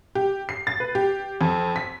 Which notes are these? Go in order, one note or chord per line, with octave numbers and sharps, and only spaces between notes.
G4
C7
A6
B4
G4
F2
B6